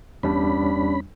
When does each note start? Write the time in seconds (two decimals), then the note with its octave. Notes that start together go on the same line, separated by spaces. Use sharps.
0.23 E2 G3 C#4 D4 B5